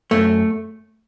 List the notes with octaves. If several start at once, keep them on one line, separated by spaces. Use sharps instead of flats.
F#2 A3